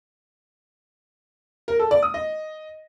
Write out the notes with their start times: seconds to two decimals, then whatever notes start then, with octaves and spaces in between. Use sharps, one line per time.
1.68 A#4
1.79 A4
1.91 D5
2.03 D#6
2.14 D#5